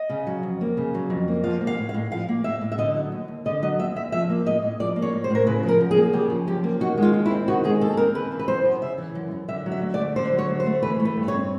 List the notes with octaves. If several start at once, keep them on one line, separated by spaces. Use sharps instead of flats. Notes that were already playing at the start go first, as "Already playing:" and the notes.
Already playing: D#5
C#3
F#3
F2
A#3
C#3
F#3
F2
A#3
F3 F5
A#3
F5
A2
F5
A2
F3 F5
A#3
A2 E5
A2
E5
D3 D#5
F#3
D#2
D#2
D3 D#5
F#3 D#5
D#2 E5
D#2 E5
F3 E5
A#3
A2 D#5
A2
F3 D5
A#3
C#5
A2
C5
A2 A#4
C#3 B4
F3
A#4
F#2
G#4
A#3
C#3 G4
F3
F#2 G4
A#3
D#3 F#4
G#3 F4
D#2
E4
C4
D#3 F#4
G#3 G#4
D#2 A4
C4 A#4
C#3 B4
E3
B4
F#2 C5
F#2
C#3 E5
E3
F#2
F#2
D3 E5
F#3
E5
D2
D5
A3
D3 C5
F#3
C#5
D2
C5
A3
E3 B4
A3
B4
G2
C#5
C4